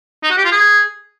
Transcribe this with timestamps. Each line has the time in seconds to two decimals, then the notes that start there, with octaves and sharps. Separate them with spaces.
0.23 D#4
0.30 F#4
0.37 G4
0.44 F4
0.51 G#4